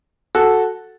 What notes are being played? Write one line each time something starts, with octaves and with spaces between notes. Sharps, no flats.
F#4 A4